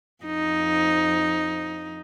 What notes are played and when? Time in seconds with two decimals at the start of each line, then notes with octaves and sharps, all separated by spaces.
0.24 F2 D#4